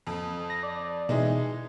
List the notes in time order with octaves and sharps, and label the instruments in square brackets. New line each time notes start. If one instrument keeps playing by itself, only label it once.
[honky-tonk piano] F2
[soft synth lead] A#6
D5
[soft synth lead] B2 [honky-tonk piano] E3 G#3 D#4